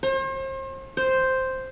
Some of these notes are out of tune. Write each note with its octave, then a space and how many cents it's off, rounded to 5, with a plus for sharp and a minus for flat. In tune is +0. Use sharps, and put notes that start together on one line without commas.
C5 +40
C5 +0